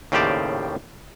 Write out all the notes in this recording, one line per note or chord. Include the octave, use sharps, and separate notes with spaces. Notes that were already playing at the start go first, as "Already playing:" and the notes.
D#2 A2 C#3 G4 C5 D5